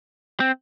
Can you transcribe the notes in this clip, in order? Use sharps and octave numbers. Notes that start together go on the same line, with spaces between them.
C4